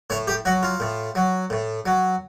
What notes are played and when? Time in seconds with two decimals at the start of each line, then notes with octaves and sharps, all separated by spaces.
0.10 A2 C#5
0.28 G4
0.45 F#3 F#4
0.63 F4
0.80 A2
1.15 F#3
1.50 A2
1.86 F#3